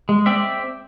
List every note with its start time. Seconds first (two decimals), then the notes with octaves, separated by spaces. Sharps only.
0.09 G#3
0.26 C4 D5 E5